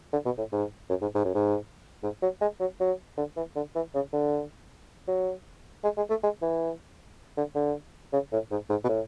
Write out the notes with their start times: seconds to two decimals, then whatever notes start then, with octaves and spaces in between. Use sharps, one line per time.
0.13 D3
0.26 B2
0.38 A2
0.52 G#2
0.90 F#2
1.02 G#2
1.15 G#2
1.25 F#2
1.35 G#2
2.03 G#2
2.22 F#3
2.41 G#3
2.60 F#3
2.80 F#3
3.17 D3
3.37 E3
3.56 D3
3.75 E3
3.95 C#3
4.13 D3
5.08 F#3
5.84 G#3
5.97 G#3
6.10 A3
6.23 G#3
6.42 E3
7.37 D3
7.55 D3
8.13 C#3
8.33 A2
8.51 G#2
8.70 G#2
8.84 B2
8.89 A2